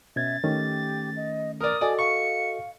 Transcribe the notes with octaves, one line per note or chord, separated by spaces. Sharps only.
B2 C#4 E5 G#6 A6
D#3 A3 C#4 G4
D#5
A#4 D5 D#6 F6
F#4 A4 D5 D#5 G#5
F5 C#6 C#7